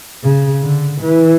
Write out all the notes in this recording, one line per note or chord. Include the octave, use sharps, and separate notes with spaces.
C#3
D3
E3